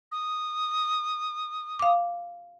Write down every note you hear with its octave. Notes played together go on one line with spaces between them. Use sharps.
D#6
F5 D6